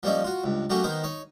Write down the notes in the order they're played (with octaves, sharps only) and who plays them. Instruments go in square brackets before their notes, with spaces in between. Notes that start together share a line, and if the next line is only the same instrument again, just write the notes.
[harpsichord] F3 G3 A#3 C#4 D#4 E5
F4 F#4
C#2 G2
F#3 A3 A#3 C#4 F#4 G4
D#3 B3 D#4 A#4 C5
D#4 C#5